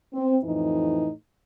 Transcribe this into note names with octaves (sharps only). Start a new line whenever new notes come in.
C4
F2 A2 E3 D#4